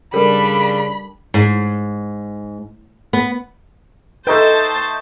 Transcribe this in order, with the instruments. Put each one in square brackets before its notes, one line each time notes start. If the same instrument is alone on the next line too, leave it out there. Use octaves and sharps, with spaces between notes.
[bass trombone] C#3 [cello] G3 D4 [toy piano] A4 A#4 [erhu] B5
[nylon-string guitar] G#2
B3
[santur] A3 D#4 G5 [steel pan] A4 B4 [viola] C5 A5